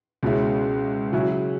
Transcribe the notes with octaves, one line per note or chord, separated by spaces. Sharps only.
C#2 B2 G#3 C#4 E4
C#3 F#3 C#4 E4